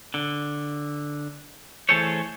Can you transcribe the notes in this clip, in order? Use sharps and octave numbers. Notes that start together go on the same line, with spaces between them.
D3
E3 A3 G#4 A4 C5 C#5